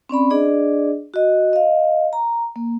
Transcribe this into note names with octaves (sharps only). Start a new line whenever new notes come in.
C4 C#4 D5 B5
D4 G#4 D5 D#5
F#4 D#5
D#5 F5
A#5
A#3